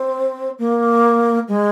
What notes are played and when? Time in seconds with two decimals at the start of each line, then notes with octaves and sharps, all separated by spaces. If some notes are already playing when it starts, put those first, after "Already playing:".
Already playing: C4
0.58 A#3
1.47 G#3